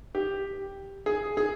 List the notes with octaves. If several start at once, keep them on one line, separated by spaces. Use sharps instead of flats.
G4
G#4
G#4